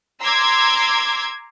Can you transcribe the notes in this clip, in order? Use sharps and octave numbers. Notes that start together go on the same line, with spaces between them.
A#5 C6 D6 E6 G#6